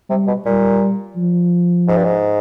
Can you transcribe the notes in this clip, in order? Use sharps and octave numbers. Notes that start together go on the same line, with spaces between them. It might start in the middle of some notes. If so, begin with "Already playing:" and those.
C3 G3
B2
A#2 G3
F3
G#2
G2
G#2